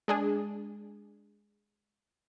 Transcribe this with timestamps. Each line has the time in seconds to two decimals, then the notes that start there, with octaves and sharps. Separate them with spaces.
0.08 G#3 D4 G#4